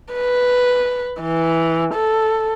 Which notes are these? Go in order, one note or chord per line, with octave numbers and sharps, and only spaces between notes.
B4
E3
A4